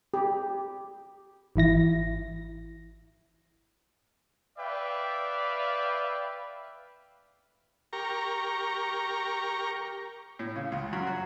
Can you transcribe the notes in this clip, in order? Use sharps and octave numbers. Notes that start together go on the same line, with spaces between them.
G4
G#1 E3 E4 A#6
B4 D5 E5 F5 G5
G4 A#4 A#5 C#6
A2
C#3
C#2
F#2
F#3